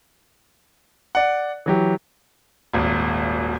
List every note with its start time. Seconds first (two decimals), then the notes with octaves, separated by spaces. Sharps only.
1.15 D5 F#5
1.66 E3 F#3 G4
2.73 D#1 G#1